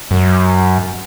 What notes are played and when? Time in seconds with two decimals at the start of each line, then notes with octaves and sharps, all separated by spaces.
0.11 F#2